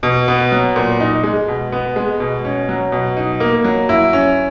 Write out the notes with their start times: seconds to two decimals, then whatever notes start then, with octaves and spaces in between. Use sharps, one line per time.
0.03 B2
0.28 B3
0.52 F#3
0.76 A#2
1.00 D#4
1.23 G#3
1.48 B2
1.72 B3
1.96 G#3
2.20 B2
2.45 C#4
2.69 F#3
2.92 B2
3.17 D#4
3.40 A#3
3.64 F#3
3.89 E4
4.13 C#4